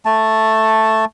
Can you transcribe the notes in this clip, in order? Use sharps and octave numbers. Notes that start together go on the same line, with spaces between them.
A3 A5